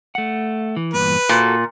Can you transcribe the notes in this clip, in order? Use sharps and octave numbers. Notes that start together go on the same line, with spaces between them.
A3 F#5
E3
E2 G2 A#2 B4
A#2 F#4 A4